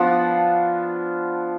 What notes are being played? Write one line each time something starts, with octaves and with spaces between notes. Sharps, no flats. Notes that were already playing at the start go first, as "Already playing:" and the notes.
Already playing: F3 B3 D4 F4 F#5